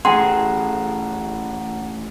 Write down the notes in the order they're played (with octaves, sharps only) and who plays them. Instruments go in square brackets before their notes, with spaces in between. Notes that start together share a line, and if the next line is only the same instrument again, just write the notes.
[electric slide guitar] E3 A3 C#4 [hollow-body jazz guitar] G#4 [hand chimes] F#5 A#5 [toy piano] G5 C6